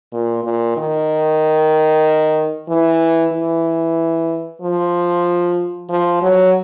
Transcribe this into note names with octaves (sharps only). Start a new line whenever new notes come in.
A#2
A#2
D#3
E3
E3
F3
F3
F#3